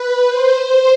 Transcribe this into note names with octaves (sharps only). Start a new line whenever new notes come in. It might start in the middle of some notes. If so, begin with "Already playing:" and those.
Already playing: B4
C5